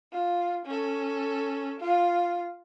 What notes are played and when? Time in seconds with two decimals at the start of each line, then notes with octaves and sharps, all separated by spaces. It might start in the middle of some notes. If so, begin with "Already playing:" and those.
0.13 F4
0.66 C#4 A4
1.80 F4